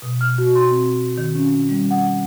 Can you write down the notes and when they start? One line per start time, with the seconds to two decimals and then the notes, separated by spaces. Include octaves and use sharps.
0.02 B2
0.21 F6
0.38 F#4
0.55 C6
0.71 C4
1.18 D#3
1.35 C#4
1.69 G3
1.91 F#5